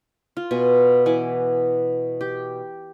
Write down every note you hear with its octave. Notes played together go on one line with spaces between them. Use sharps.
F4
B2 G#5
E3 F#5 G#5 D6
G4